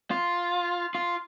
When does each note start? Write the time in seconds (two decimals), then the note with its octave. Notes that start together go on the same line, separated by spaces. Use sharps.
0.11 F4
0.95 F4